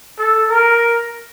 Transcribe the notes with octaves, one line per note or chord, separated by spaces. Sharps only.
A4
A#4